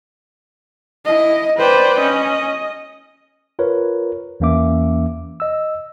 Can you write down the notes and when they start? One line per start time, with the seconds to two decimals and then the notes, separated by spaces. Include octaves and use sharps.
1.05 E4 D#5
1.58 B4 C5 D5 G5
2.00 C#4 D#5
3.59 F4 A#4 B4 C#5
4.40 E2 E3 A#3 C#4 E5 D6
5.40 D#5 E6